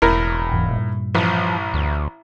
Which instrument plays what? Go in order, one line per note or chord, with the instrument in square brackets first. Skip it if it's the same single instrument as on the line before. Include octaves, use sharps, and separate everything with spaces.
[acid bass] E1 [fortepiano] A2 A#4
[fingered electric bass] D#2 G#2 E3
G2 A#2
[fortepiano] A1 [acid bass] F3
[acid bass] D2